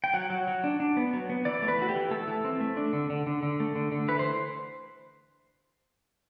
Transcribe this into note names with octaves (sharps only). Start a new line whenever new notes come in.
G5
F#3 F#5
F#3
F#3
D4
D4
B3
F#3
B3
E3 D5
A3
B4
E3 F#4
G4
E3
A3 A4
E3
C4
A3
D4
D3
D3
D3
D3
A3
D3
D3
E3 B4
C5